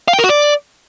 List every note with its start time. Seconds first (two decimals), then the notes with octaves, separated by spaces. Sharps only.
0.08 F5
0.13 G5
0.19 A#4
0.24 F#4
0.29 D5